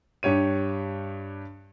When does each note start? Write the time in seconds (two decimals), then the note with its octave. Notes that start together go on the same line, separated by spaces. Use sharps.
0.23 G2 G4 C#5 D#7